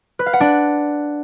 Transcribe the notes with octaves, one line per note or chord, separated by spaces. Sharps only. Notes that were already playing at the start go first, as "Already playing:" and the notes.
B4
F5
F#5
D4